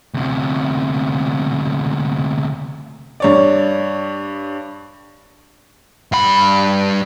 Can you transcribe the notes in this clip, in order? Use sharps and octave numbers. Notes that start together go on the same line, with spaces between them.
D2 C3
G2 C#5 D5
G2 B5